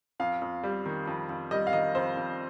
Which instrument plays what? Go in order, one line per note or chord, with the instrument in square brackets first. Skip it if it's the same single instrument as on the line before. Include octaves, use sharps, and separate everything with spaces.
[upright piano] F2 F5
F2
G3
D#3
F2
F2
G3 D#5
F5
D#3 D#5
F2 C5
F2